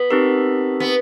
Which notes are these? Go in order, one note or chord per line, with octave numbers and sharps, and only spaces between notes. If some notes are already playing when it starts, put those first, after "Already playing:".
Already playing: B3
C4 D#4 G4 A#4
B3